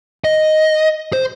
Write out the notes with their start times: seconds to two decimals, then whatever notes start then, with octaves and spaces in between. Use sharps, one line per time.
0.24 D#5
1.13 C5